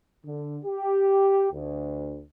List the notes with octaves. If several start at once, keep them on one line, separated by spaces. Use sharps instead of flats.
D3
G4
D2